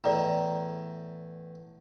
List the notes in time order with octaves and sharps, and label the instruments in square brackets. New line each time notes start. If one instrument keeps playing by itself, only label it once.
[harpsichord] E2 A2 [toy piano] D5 A#5